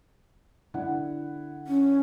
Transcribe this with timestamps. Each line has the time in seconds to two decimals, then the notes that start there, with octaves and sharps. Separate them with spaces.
0.74 D3 E4 F#5
1.67 C#4